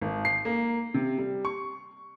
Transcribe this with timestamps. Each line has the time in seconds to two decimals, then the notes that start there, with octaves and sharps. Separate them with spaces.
0.01 G#1
0.25 C7
0.45 A#3
0.94 C3
1.18 G3
1.45 C#6